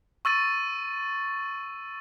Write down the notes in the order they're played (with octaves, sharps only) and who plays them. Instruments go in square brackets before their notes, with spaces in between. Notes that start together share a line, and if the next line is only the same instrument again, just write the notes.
[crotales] C#6 E6 A6 D#7